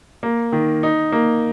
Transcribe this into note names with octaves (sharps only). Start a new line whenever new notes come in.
A#3
D#3
D#4
A#3